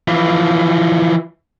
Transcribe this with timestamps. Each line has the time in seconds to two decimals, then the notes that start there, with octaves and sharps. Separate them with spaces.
0.08 E3 F3